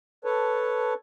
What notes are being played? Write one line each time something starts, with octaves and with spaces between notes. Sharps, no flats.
A4 B4 C#5 A5